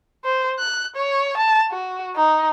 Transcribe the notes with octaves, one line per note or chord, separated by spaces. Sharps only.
C5
F#6
C#5
A5
F#4
D#4